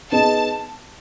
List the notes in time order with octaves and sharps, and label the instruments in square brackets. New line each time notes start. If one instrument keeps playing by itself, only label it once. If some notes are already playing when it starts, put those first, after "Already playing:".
[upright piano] B3 D#4 G#4 D#5 [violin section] A5